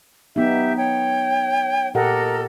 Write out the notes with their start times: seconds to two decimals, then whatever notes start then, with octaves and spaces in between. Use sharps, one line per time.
0.36 F#3 B3 D#4 G4 E5
0.77 C#5 G5
1.94 A#2 G4 A4 A#4 D#5 F#5